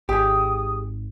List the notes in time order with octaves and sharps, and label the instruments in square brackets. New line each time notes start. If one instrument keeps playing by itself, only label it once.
[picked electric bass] G#1 [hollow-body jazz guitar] G4 G#4 [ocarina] D#6